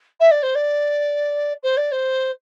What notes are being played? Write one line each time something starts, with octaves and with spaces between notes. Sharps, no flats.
E5
D5
C5
D5
C5
D5
C5